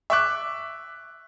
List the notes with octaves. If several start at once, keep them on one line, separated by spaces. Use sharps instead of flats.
E5 C#6 D6 F#6